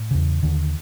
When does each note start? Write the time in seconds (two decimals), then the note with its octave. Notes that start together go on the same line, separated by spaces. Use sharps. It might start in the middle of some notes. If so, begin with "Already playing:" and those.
Already playing: A2
0.11 E2 C#3
0.43 D#2 D3